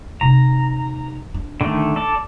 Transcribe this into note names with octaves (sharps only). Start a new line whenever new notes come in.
C3 D#4 A#5
D4
D3 D#3 A3
A4 D5